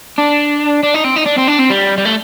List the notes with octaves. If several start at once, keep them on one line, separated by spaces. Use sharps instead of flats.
D4
D4
D#4
C4
D#4
D4
C4
D4
C4
G3
G3
A3